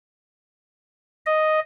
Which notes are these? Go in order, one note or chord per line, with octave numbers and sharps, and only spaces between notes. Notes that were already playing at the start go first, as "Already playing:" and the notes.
D#5